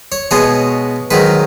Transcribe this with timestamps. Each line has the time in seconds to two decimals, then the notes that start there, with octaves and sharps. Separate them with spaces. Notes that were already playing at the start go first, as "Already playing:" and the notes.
0.12 C#5
0.31 B2 G#3 B3 C#5
1.11 G#2 D#3 F#3 B4